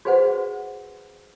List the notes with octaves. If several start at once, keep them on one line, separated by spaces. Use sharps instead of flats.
F#4 G#4 B4 C5 F#5